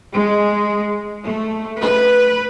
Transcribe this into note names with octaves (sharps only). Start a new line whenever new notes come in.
G#3
A3
B4